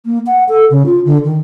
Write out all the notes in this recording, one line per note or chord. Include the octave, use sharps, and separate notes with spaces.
A#3
F#5
A4
C#3
F4
D3
D#3